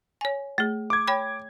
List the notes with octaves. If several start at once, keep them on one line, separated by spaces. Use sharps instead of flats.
C#5 G#5
A3 G#4
D6 G#6
C#5 G5 B5